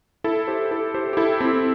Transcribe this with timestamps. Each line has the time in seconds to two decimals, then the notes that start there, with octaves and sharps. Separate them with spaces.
0.24 E4 A4
0.47 G4 C5
0.71 E4 A4
0.94 G4 C5
1.13 G4
1.17 E4 A4
1.40 C4 E4